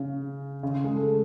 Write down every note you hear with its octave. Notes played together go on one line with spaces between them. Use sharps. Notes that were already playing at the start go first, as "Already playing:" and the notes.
Already playing: C#3
C#3
C#3
G#3
A3